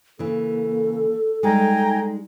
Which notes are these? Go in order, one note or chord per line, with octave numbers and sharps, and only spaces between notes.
C#3 E3 A#3 A4
G3 G#3 D#4 G5 G#5 A#5